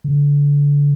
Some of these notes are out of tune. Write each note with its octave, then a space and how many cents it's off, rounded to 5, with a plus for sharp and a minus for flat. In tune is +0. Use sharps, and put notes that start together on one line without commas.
D3 -30